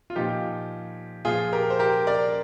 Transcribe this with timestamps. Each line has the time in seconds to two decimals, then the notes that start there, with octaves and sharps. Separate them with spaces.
0.10 F4
0.15 A#2 F3 D#4 G4
1.25 A#2 F3 F4 G#4
1.53 G4 A#4
1.70 C5
1.79 G4 A#4
2.07 A#4 D5